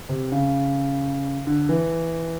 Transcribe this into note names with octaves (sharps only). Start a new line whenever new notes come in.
C3
C#3
D3
E3